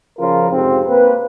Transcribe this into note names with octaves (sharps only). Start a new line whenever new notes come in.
C#3 F3 F4 A#4
F2 G#2 C3 C4
A#3 C4 B4